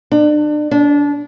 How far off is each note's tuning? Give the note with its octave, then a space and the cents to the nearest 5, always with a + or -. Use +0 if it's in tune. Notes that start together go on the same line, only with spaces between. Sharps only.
D4 +35
D4 -25